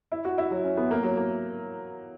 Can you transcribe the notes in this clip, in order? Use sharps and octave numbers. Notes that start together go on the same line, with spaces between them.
E4
F#4
E4
F#3
C#4
B3
A#3
F#3
A#3